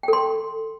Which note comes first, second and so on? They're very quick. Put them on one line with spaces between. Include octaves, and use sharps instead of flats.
G5 A4 C6